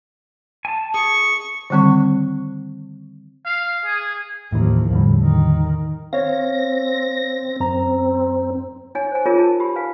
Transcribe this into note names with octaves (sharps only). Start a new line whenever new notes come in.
G#5 A5
G#4 C#6
D3 D#3 G3 C4 C#6
F5
G#4
D#2 A2 E3 F3
E2 A2 D3 G3
D#3
C4 C#5 F5 A#6
F#2 C4 A#5
D#4 C#5 G#5
C5 G#5
D#4 F4 G#4 A#4 C#5
A5
G4 B5
B4 F5 G#5